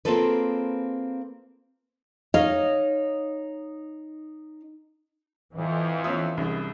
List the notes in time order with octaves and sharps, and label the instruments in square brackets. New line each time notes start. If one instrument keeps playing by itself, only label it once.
[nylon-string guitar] A#3 C4 F4 G#4 A4 B4
D#4 C#5 D#5 F5
[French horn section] F2 [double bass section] E3
[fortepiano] F3 B3 C#4 [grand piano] E5 D#6 E6
[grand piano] C2 [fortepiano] F#2 D#4 G#4